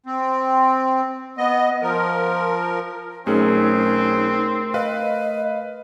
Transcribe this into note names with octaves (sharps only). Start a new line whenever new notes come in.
C4
B3 D#5
F3 A#4
B1 A3 C4 C#4 D#4 G#4 A#4
B4 D#5 F5